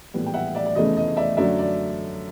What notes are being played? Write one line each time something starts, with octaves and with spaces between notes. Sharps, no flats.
A#1 A2 E3 G3 B3
G5
E5 F#5
D5 E5
D5
F1 E2 C#3 E3 A3 D#5
D#5
D5 E5
F#2 D3 F#3 A3 D5 E5
D5